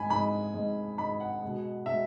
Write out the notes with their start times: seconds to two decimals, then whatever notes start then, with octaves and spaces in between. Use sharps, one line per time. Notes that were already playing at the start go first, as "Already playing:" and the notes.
Already playing: G#2 G#3 G#5 B5
0.10 G#2 G#3 B5
0.54 G#2 G#3
0.98 G#2 G#3 B5
1.20 F#5
1.42 B2 G#3
1.86 B2 G#3 E5